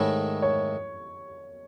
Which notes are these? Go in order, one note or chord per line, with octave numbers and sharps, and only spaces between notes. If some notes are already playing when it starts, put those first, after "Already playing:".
Already playing: G#2 D#3 A3 E4 C#5
C#5